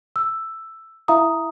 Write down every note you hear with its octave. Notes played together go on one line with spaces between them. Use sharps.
E6
E4 E5 F5 A#5 D#6